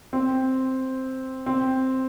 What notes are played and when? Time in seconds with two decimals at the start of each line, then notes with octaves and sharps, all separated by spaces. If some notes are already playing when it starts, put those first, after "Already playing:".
0.13 C4
1.46 C4